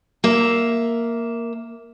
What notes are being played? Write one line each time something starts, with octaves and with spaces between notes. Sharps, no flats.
A#3 E5